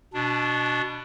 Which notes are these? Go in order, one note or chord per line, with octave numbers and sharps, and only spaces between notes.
B2 D4